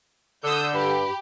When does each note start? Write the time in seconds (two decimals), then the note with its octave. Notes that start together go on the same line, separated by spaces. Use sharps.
0.44 D3 D#6 E6 G6
0.74 G2 G4 B5